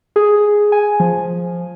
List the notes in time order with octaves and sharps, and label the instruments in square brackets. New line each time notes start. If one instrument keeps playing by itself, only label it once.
[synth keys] G#4
G#5
F3